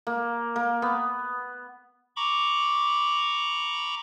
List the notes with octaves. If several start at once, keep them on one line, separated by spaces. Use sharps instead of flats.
A#3
A#3
B3
A#5 B5 C#6 D6